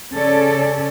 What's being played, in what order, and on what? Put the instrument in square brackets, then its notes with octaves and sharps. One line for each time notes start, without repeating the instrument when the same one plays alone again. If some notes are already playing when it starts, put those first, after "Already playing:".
[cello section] C#3 C#4 A4 D5